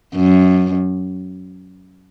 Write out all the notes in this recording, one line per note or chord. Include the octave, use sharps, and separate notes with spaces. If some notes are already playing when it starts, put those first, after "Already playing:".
F#2